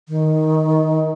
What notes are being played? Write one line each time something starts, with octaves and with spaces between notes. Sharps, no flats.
D#3